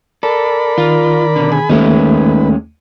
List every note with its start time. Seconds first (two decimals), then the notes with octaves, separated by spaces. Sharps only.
0.23 A4 A#4 D5 B5
0.78 D#3 F4
1.36 B2 D3
1.52 G#4 G#5 B5
1.69 D#2 D#3 G#3 A3 C#4 D#4 B4